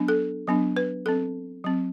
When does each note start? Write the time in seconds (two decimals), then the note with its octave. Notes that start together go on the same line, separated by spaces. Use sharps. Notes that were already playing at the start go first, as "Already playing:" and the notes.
Already playing: F#3 B3 D4
0.08 A4
0.47 F#3 B3 D4
0.76 B4
1.06 F#3 C4 A4
1.64 F#3 C4